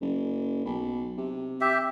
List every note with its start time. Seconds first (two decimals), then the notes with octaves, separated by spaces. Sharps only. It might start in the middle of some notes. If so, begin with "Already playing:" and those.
0.01 F#1
0.65 B1
1.18 C3
1.61 G4 E5